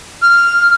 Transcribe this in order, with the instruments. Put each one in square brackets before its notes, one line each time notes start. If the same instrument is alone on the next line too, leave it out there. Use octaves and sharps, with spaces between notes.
[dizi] F6